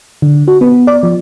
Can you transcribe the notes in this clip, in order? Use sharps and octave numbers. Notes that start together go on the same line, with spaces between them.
D3
F#4
B3
D5
F3